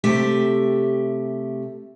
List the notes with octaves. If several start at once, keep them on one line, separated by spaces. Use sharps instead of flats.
C3 A3 G4 E5